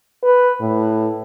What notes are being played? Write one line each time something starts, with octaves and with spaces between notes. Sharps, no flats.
B4
A2